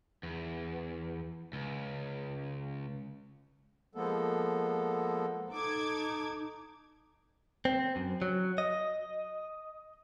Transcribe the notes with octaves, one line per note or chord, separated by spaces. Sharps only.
E2
C#2
F3 G#3 A#3 B3 A4
D#4 A4 D6 G#6
C4
F#2
F#3
D#5